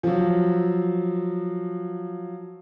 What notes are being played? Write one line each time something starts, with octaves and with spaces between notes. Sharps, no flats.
F3 F#3